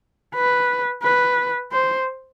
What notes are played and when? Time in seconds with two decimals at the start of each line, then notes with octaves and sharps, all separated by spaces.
0.35 B4
1.03 B4
1.72 C5